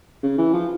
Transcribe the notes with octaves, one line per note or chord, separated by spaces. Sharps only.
C#3
E3
F3